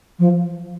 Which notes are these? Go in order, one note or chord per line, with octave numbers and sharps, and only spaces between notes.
F3